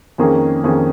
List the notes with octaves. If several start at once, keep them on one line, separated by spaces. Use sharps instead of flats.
F2 D#3 A#3 C#4 G#4
F2 D#3 A#3 C#4 G#4